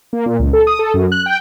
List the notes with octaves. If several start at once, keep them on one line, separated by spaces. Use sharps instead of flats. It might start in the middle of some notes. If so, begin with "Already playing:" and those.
A#3
A#2
C#2
A4
D#6
A4
F#2
F#6
G5